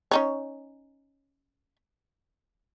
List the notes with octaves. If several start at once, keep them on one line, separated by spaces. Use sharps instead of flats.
C#4 D#4 C#5